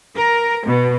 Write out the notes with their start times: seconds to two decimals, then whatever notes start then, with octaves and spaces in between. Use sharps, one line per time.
0.16 A#4
0.66 B2